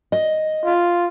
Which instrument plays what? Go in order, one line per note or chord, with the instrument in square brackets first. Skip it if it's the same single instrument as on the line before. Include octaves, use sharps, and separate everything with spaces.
[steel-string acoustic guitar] D#5
[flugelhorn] F4